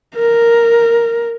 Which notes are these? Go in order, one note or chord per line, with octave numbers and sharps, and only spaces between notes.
A#4